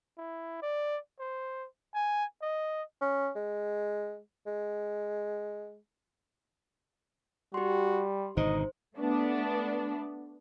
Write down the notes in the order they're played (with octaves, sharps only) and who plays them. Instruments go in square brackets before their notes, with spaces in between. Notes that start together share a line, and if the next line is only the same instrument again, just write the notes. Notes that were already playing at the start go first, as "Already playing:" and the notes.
[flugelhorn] E4
D5
C5
G#5
D#5
[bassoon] C#4
G#3
G#3
[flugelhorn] G3 [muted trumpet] F#4 [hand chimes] G4 C6
[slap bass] G#1 B2 D3 [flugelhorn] D#4 [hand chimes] C5 [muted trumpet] D#5
[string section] A3 B3 D4